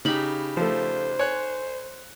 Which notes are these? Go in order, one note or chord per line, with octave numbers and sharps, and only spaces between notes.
C#3 D#4 G4 B5
F3 A3 C5
C#5 G#5 F#6